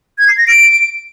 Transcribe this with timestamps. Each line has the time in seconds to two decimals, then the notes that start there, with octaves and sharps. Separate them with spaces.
0.18 G#6
0.28 C7
0.38 A#6
0.47 D7